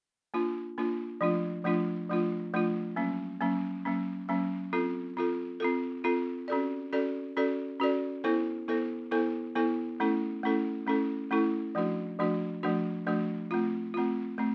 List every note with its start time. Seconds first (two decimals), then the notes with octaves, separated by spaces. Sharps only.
0.34 A#3 D4 F4
0.78 A#3 D4 F4
1.21 F3 A3 D4 F4
1.64 F3 A3 D4 F4
2.09 F3 A3 D4 F4
2.53 F3 A3 D4 F4
2.96 F#3 A#3 C#4
3.41 F#3 A#3 C#4
3.85 F#3 A#3 C#4
4.29 F#3 A#3 C#4
4.73 C4 F4 A4
5.17 C4 F4 A4
5.60 C4 F4 A4
6.04 C4 F4 A4
6.48 C#4 F#4 A4 D5
6.93 C#4 F#4 A4 D5
7.37 C#4 F#4 A4 D5
7.80 C#4 F#4 A4 D5
8.24 B3 E4 A4 C5
8.68 B3 E4 A4 C5
9.11 B3 E4 A4 C5
9.55 B3 E4 A4 C5
10.00 A3 C#4 E4 A4
10.43 A3 C#4 E4 A4
10.87 A3 C#4 E4 A4
11.31 A3 C#4 E4 A4
11.75 F3 A3 D4 F#4
12.19 F3 A3 D4 F#4
12.63 F3 A3 D4 F#4
13.07 F3 A3 D4 F#4
13.51 A3 C4 F4
13.94 A3 C4 F4
14.38 A3 C4